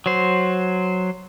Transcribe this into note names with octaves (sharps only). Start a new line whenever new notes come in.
F#3 C5